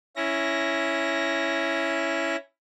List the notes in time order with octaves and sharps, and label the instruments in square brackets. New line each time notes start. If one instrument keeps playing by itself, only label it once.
[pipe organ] C#4 E4 A#6